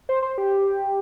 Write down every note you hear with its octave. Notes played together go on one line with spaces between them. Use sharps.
C5
C5
G4